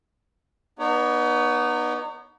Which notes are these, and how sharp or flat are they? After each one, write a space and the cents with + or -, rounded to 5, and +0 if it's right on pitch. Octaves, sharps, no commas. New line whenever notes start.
B3 -20 D#4 -30 C#5 +25